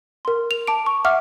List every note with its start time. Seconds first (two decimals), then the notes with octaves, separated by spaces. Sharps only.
0.25 A#4 C6
0.51 F7
0.67 A5 D6 D7
0.86 C#6
1.05 E5 F#5 D6 F6